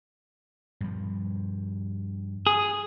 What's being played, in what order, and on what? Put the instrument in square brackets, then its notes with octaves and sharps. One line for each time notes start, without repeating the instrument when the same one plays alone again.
[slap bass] G2 F3
[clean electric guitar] G#4